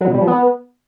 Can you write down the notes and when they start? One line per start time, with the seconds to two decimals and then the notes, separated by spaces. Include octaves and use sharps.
0.01 F#3
0.07 B2
0.14 G3
0.21 F3
0.27 B3